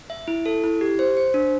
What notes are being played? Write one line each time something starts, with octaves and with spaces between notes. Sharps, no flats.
E5
E4
A4
E4
G4
C5
C5
D4